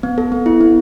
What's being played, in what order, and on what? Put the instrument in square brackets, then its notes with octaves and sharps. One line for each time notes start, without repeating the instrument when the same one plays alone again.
[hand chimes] B3
A4
B3
E4
B3